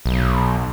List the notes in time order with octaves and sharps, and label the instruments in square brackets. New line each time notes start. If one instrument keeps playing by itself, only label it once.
[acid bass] B1